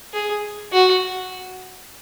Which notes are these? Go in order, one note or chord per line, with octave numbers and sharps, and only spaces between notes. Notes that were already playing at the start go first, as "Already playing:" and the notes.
G#4
F#4